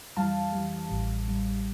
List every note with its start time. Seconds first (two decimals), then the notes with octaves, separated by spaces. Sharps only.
0.17 F2 E3 G3 F5 A5
0.53 F2 E3 G3
0.88 A1 A2 G3
1.24 A1 A2 G3